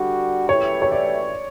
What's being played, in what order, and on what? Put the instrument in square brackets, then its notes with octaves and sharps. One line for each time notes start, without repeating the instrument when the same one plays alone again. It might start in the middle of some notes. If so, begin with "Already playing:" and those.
Already playing: [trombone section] D3 G3 D4 F#4
[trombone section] F#2 E3 A3 E4 G4 [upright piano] C#5
[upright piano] C#5
D5